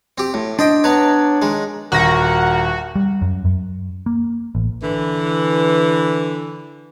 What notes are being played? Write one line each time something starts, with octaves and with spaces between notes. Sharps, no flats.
C4 G4
A2
D4 C5 D#5 G5
B3 D4 B4 C#5 A#5
D#3 G#3
D#1 F#4 A#4 A#6
G3
F#2
F#2
A#3
A1
D3 E3